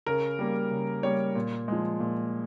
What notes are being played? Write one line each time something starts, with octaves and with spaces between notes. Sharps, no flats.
C#3 A#4
G3 A#3
C#3
G3 A#3 C#5
A#2
F3 G#3
A#2